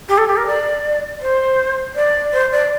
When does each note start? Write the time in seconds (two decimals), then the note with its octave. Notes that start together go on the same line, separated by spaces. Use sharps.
0.08 G4
0.17 A4
0.28 G4
0.36 A#4
0.46 D5
1.20 C5
1.95 D5
2.33 C5
2.52 D5